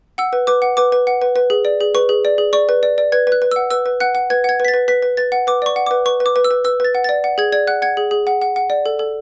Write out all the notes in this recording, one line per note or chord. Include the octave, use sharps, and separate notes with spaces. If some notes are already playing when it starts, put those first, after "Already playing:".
F#5 E6
B4
B4 D6
F#5
B4 D6
B4
F#5
B4
B4
G#4
D5
G#4
B4 C#6
G#4
D5
G#4
D5 C#6
B4
D5
D5
B4 G#6
B4
F#6
B4
F#5 E6
B4 E6
B4
F#5 F#6
F#5
B4 G#6
F#5 G#6
B4 B6
A6
B4
B4 B6
B4
B4 A6
F#5
B4 D6
D5 C#6
F#5
B4 D6
B4 C#6
B4
D6
B4
E6
B4
B4 E6
B4 A6
F#5
D5 A6
F#5
G#4 G#6
D5 G#6
F#5 F#6
F#5 G#6
G#4
G#4
F#5
F#5
F#5
D5
A4
A4